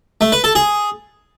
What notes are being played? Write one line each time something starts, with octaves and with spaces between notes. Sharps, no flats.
A3
B4
A4
G#4